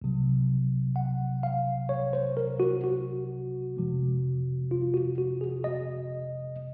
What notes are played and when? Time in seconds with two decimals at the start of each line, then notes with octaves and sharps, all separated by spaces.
0.02 C2 C3 F#3
0.96 F#5
1.43 F5
1.89 C#5
2.13 C5
2.37 A#4
2.60 F#4
2.84 F#4
3.77 F2 C3 F3 G#3
4.71 F4
4.94 F#4
5.18 F#4
5.41 G#4
5.64 D#5